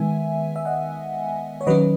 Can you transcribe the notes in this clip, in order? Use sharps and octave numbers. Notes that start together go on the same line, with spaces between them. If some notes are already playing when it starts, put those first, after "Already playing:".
Already playing: D#3 G#3 B3 E5 G#5
E5
D#5 F#5
C#5
D#3 F#3 C#4 B4 D#5